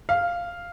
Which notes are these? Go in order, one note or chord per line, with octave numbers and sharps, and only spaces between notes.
F5